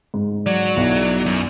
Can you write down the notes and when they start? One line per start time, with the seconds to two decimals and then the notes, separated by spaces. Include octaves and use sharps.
0.14 G#2
0.46 F#3 D5
0.77 B1 E4
1.26 F#2